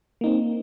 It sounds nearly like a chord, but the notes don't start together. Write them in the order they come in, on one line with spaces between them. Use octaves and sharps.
A#3 D#4 C4